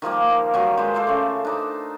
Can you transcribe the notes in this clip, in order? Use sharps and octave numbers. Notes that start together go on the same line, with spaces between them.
D#3 F3 G3 A#3
D#3 F#3 G3
G#3 F4 B4 C5
A4 C5 D5 F5
C#3 A3
D4 D#4 C5